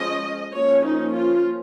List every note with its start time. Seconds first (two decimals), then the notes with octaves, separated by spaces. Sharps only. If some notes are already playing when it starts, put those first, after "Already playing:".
Already playing: F3 G#3 C#4 D#5
0.53 F3 A#3 C#4 C#5
0.83 D#4
1.13 F4